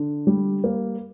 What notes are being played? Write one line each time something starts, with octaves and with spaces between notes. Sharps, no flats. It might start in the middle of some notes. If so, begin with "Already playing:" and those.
Already playing: D3
G3
A#3